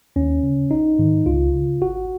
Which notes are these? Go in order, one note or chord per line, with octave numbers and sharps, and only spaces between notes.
D#2 C#4
C#3
A#1 D#4
G#2 D#3
C#2 F4
C#3
G#1 F#4